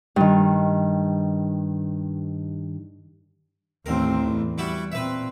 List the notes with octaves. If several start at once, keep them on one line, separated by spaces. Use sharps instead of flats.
G2 D#3
A1 D#2 C4 A#4
E2
G3 E4 F#4
A#2 C4 B4 E5